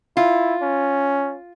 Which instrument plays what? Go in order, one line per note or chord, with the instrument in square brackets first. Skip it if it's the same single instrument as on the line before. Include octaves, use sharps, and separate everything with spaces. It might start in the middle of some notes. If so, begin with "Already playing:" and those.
[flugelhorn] E4 [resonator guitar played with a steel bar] F4
[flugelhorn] C#4